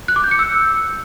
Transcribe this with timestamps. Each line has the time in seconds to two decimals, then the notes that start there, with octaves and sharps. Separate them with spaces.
0.08 F#6
0.16 D6
0.24 G6
0.31 C#7
0.39 E6